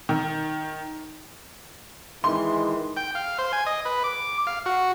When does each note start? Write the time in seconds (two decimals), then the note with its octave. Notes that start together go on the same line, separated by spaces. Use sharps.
0.09 D#3
2.24 D#3 E3 G#3 C6
2.97 G5
3.15 F5
3.38 C5
3.53 G#5
3.66 D#5
3.85 B4
4.04 D6
4.47 F5
4.66 F#4